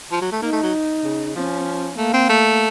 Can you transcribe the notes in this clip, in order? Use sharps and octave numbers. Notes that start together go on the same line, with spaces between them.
F3
F#3
A3
A#3 D#4
A3
F#3
C#3
F3 C#4
A3 A#3
C4
A3